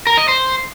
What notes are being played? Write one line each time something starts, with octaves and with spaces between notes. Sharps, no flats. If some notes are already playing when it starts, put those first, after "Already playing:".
A#4
D#5
C5